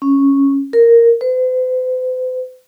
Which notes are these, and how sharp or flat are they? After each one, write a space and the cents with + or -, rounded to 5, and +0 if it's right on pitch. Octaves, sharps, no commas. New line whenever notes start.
C#4 -5
A#4 -5
C5 -45